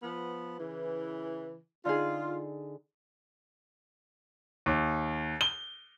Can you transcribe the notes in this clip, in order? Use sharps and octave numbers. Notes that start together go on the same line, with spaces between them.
F3 B3 F6
C#3 E3
D3 D#4 F4 G#4
D#2
G7